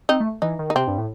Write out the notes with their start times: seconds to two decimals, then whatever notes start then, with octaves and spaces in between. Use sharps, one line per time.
0.09 C4 D#4
0.20 A3
0.42 E3 D#4
0.59 D#3
0.70 D#4
0.75 C3 C4
0.88 G2
0.98 A2